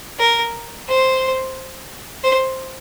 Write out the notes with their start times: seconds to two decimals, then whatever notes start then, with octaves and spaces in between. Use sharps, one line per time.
0.19 A#4
0.88 C5
2.23 C5